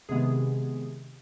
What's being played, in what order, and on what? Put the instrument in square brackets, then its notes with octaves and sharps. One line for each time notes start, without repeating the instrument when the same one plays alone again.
[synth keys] C3 D#3 G#3 B3 G#4